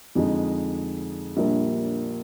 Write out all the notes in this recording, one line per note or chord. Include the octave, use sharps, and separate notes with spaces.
F2 D3 G#3 D#4
A#1 A#2 G3 A#3 D4